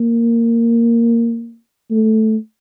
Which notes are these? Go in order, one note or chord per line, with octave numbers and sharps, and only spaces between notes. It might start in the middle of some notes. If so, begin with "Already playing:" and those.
Already playing: A#3
A3